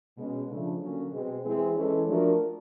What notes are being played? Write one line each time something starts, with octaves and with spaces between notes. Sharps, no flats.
B2 G#3 C#4
C#3 F3 A3 D4
D3 F#3 A#3 C#4
B2 G#3 C4
E3 G#3 C4 E4 G#4
E3 G#3 C#4 E4 A4
F3 A3 D4 F#4 A#4